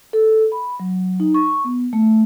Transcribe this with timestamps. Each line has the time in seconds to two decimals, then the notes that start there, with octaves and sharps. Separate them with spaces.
0.13 A4
0.52 B5
0.80 F#3
1.20 D#4
1.34 C#6
1.64 B3
1.93 A3